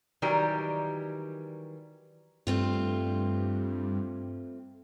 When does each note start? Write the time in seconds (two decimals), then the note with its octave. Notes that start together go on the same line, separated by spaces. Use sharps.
0.22 D#3 E3 F#3 G3 G4 A#4
2.47 G2 A3 C4 F4